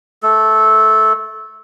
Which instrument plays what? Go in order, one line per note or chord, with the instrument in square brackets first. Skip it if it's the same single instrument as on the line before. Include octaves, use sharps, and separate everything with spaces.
[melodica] A3 A4